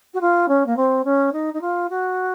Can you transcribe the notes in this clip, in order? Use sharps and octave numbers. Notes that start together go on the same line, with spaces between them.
F#4
F4
C#4
A#3
C4
C#4
D#4
D#4
F4
F#4